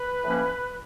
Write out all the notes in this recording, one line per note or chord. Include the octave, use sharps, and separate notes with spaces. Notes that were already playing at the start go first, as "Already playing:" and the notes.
Already playing: B4
A2 F3 A#3 C#4